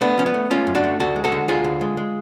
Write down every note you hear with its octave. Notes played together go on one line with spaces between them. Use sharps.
A3 B3 D4
F3 C#4
B3
A3
A3 C#4 F4
F#2
D4 F#4
A3
D2 F#4 A4
G#3
F#4 A4
D3
D2 F4 G#4
D3
G#3
G#3